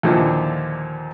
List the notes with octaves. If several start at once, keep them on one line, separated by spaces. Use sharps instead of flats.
D#2 A#2 D3 E3 F3